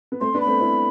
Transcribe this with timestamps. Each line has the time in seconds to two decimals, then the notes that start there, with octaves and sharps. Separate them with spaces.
0.12 B3
0.21 A3 C4 C6
0.34 B3 D4
0.41 B5
0.47 A3 C4
0.60 C4 E4